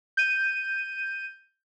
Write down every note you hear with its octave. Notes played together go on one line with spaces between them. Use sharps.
G6 D#7